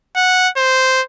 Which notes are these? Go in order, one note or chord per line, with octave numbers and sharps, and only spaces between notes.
F#5
C5